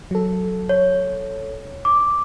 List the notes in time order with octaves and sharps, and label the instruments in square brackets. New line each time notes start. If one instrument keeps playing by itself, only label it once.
[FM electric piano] F#3 A4
[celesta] C#5
D6